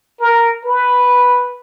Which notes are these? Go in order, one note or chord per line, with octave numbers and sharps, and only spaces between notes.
A#4
B4